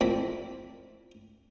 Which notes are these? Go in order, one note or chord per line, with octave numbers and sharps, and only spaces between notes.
F2 A#2 C4 E4 B5